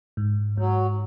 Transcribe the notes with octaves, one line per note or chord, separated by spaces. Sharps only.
G#2
G#2 F#3